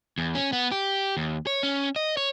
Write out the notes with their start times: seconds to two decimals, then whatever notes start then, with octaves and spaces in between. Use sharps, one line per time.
0.18 E2
0.35 C#4
0.53 B3
0.72 G4
1.17 D#2
1.47 C#5
1.63 C#4
1.96 D#5
2.17 C#5